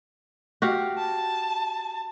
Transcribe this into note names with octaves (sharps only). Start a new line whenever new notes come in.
F#4 G4 F5
A5